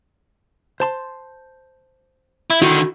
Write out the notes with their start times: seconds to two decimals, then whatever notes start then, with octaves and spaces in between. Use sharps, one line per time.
0.80 C5 A5 C6
2.50 E4
2.62 D3 D#3 E4 F#4